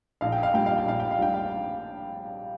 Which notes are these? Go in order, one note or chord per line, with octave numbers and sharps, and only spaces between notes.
A#1 F5
G5
F5
A#2 G3 A#3 D4 G5
F5
G5
A#1 F5
G5
F5
A#2 G3 A#3 D4 G5
F5